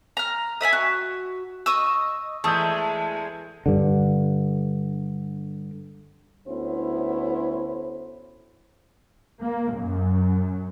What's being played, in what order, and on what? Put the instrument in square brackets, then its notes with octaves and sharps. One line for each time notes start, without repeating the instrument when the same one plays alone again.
[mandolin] A#5 F6
D#5 E5 F#5 G#5
F#4
D#5 C#6 D#6 E6
[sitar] E2 G#3 [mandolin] A3 [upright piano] A5 D#6 G6
[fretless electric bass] G2 D3
[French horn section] D2 B3 C#4 E4 C5 C#5
[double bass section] A#3
F#2